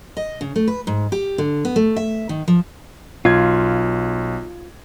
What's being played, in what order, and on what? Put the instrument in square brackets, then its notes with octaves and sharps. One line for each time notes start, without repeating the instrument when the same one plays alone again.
[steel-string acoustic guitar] D#5
C#3
A3
B4
G#2
G4
D3
B3
A3
E5
D#3
F3
[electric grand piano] B1 G#6 [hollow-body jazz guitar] F4